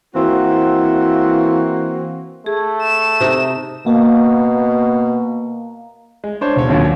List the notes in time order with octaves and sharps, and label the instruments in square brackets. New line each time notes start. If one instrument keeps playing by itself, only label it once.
[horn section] E3 A#3 C4 F#4
[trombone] A3 [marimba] G#4
[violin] E7
[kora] C3 D#4
[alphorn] B2 [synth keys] A#3
[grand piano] G#3
D4 C5 C#5
E1 B1 C#5
A#1 D#2 A#2 F#3